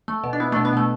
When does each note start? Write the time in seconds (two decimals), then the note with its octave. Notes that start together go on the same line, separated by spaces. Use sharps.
0.08 A3
0.24 B2
0.33 D4
0.40 B2 B3 E4
0.52 B2 A3 D4
0.65 B3
0.73 B2 A3